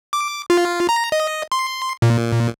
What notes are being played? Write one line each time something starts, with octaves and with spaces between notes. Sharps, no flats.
D6
F4
A#5
D#5
C6
A#2